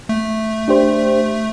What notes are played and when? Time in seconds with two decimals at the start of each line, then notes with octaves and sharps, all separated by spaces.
0.09 A3
0.68 D4 G4 C5